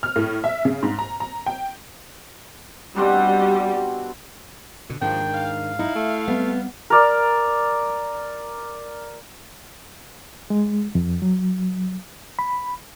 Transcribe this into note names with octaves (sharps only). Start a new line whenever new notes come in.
F6
A2
E5
C#3
G#2
A#5
A#5
G5
B2 G3 C4 D4
B2 D3
D#2 G#2 D#3 F3 D4 G5
F5
D#4 E4
A3
G3 B3 C4
A#4 D5
G#3
F2
F#3
B5